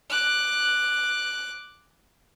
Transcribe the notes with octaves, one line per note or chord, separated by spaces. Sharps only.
D6 F#6